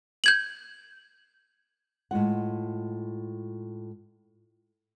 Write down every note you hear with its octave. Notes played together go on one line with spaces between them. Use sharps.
G6 G#6 F#7
A2 G#3 F4 F#5